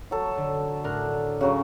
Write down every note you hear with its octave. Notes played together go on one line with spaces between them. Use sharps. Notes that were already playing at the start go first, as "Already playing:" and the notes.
F#3 A4
D3
A2 D4 A#4 F#6
C#3 F#3 C#4 F#4